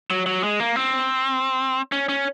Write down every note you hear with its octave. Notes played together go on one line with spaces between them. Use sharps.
F#3
F#3
G#3
A#3
C4
C#4
C#4